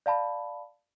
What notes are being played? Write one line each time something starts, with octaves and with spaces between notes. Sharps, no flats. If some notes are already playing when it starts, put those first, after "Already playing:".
D5 F5 A5 B5